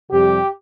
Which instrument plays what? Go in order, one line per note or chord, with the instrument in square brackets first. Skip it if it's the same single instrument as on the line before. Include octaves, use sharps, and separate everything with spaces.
[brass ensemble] F2 C3 G3 G4